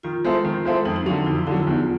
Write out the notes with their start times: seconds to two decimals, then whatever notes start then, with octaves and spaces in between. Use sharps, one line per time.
0.03 D#3 F4
0.24 G#3 C4 E4 A4
0.45 D#3
0.65 G#3 C4 E4 A4
0.85 F2 D#4
0.96 D#4
1.06 D3 F#3 D4
1.26 F2 E4
1.47 D3 F#3 E4
1.56 F4
1.67 E2